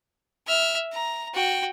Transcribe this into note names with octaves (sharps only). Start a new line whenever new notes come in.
E5 F6
A#5
F#4 G5